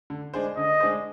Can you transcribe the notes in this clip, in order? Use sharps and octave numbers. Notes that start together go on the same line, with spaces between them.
D3
G#3 D4 G#4 C5
D3 D#5
G#3 D4 G#4 C5